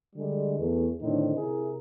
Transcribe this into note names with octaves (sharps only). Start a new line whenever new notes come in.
D3 G3 G#3
E2 A3
A2 D3 D#3 C4 D4 D#4
C3 E4 G#4 A#4